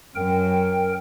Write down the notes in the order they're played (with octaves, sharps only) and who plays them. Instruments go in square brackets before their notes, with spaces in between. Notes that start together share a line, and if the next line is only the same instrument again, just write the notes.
[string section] F#2 [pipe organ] A#4 G5